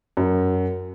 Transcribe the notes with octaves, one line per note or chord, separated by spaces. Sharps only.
F#2